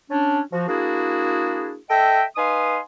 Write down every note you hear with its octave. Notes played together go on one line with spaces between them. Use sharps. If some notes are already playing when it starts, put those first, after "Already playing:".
C#4 D4
F3 F#4
A#3 D4 E4 F#4 G#4
A4 D#5 E5 G5
D#4 B4 F5 G#5 C6 D#6